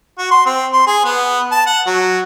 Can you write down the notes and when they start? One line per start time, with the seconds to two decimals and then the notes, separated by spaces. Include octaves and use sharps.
0.18 F#4
0.31 C6
0.46 C4
0.73 C6
0.87 G#4
1.05 B3
1.52 A5
1.66 F#5
1.86 F#3